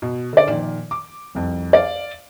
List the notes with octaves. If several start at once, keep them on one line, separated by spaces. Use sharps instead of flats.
B2
D3 D5
A#2 D#3 F3
D6
C2 F2
D5 F5